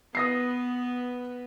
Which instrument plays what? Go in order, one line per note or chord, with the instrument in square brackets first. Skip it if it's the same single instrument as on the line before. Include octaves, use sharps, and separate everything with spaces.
[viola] B3 B4 [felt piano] D#6 A#6 C7